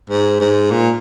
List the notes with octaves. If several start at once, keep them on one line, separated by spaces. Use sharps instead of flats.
G#2
G#2
A#2